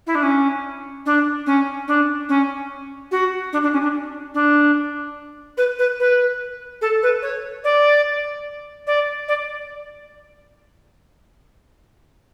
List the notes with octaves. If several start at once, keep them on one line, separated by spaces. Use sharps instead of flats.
E4
D4
C#4
D4
C#4
D4
C#4
F#4
D4
D4
C#4
D4
D4
B4
B4
B4
A4
B4
C#5
D5
D5
D5